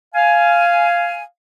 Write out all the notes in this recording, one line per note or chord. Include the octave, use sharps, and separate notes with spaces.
F5 G#5